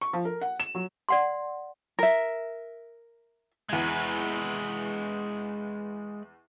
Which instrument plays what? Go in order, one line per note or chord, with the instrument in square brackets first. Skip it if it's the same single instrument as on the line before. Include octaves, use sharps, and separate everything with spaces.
[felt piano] C#6
F3
A#4
F#5
E7
F#3
[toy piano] D5 F#5 C6
[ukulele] A#4 E5
[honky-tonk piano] E2 G#6 [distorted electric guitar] G#3 B4